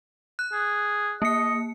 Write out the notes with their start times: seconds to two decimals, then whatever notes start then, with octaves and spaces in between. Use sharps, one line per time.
0.39 F#6
0.53 G#4
1.22 A#3 D#5 C#7